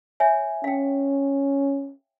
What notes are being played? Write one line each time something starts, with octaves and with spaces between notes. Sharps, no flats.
C#5 E5 G#5
C#4 F5 G5